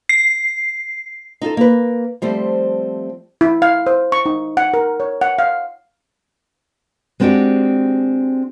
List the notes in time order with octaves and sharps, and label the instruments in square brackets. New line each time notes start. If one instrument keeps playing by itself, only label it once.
[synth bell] C7
[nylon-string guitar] D#4 F4 G4 A4
A#3 B4
F3 G3 A3 C4
[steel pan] E4
F5
C5
C#6
D#4
F#5
A#4
C#5
F#5
F5
[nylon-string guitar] G#3 B3 C4 D4 F#4 G4